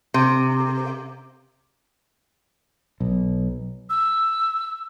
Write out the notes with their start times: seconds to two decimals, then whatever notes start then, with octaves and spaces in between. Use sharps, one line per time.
0.14 C3
3.00 B1
3.90 E6